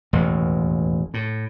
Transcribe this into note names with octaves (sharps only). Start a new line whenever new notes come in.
E1 A1 D#2
A2